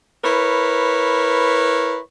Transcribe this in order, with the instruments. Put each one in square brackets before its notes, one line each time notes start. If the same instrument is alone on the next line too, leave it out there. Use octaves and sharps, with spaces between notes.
[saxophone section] E4 A#4 B4 C#5